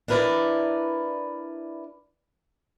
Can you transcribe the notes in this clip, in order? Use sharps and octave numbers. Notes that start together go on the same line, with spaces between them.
D4 E4 A#4 B4 D5